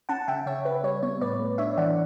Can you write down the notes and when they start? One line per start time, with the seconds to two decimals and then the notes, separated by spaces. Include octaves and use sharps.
0.09 C#4 F#5 A5
0.28 C#3 E5 G5
0.46 C#3 C#5 E5
0.65 C#4 B4
0.83 G3 C#5
1.03 B3 C#5
1.21 A2 B4 D5
1.39 A3
1.58 D4 C#5 E5
1.78 E3 D5 F#5